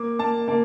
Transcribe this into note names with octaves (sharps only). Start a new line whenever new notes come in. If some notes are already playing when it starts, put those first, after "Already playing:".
Already playing: A#3 D6
A#3 A5
A#3 A5